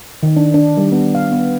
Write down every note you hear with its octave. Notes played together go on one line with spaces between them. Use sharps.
D#3
D4
D4
G3
B3
F5
B3